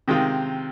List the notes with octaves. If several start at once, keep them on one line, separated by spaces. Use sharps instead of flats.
C3 D#3 G#3 C4 F4